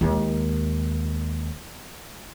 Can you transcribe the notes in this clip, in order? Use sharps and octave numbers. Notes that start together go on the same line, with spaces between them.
D#2 G#3